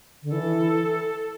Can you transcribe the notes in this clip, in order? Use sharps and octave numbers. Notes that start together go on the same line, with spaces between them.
D3
E3 A4